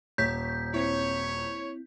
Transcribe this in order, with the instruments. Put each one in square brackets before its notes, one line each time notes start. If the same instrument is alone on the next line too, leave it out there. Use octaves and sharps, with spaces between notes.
[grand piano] D#1 [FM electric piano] C#5 [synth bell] G6 B6
[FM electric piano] C4 E4 [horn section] C#5